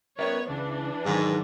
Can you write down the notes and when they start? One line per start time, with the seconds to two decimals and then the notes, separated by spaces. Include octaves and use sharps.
0.19 B3 A#4 C#5 D5 E5
0.49 C#2 E3 D4
1.06 G#2 D#3 F#3